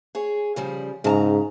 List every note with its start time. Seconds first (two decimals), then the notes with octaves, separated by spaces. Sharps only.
0.15 G#4 C#5
0.56 C#3 F3 G3
1.04 G#2 C#3 A5 A#5